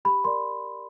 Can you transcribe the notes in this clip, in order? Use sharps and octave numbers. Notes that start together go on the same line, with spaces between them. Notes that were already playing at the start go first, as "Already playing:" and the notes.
G4 B5
A#4 D5 C6